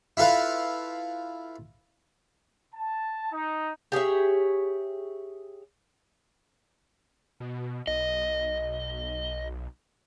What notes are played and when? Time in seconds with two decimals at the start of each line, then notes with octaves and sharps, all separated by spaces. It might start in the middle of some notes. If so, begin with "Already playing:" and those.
0.17 E4 F4 A4 B4 F5
2.75 A5
3.32 D#4
3.92 G4 G#4 C#5 E5
7.40 B2
7.87 B1 D#5